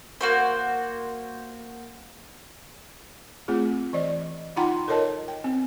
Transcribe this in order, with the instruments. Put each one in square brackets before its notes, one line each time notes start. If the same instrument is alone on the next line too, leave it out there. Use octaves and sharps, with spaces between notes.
[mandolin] A#3 F#4 C5
[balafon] A3 C4 F4 G#4
E3 D5 D#5
D#4 F4 F#5 G5 A#5 C6
A4 A#4 C#5 D#5 A5
G5
C4